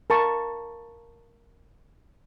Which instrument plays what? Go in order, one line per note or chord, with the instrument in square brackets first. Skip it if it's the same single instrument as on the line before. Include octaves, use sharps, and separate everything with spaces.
[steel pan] A#4 A5 C#6